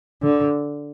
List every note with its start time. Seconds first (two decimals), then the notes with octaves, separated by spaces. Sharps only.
0.22 D3